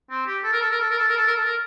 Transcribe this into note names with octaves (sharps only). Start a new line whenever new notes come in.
C4
G4
A4
A#4
A4
A#4
A4
A#4
A4
A#4
A4
A#4
A4
A#4